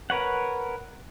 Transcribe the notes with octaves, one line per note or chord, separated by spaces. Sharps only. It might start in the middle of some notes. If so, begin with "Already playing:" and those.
A#4 B4 C#5 F#5